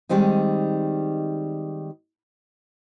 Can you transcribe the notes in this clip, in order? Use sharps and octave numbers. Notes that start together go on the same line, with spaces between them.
D#3 G3 G#3 C4 D#4